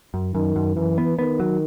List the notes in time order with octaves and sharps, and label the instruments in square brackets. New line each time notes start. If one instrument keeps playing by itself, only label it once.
[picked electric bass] F#2
[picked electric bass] F#2 [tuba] D#3
[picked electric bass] F#2
[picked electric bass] F#2 [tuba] E3
[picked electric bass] B3
[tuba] D#3 [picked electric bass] B3
[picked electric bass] F#3